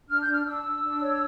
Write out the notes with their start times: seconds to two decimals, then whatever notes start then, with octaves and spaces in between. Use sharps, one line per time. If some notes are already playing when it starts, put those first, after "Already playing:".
0.08 D4 F6
0.21 G6
0.27 D4
0.33 F6
0.45 D4 E6
0.64 D4
0.82 D4
1.01 C#5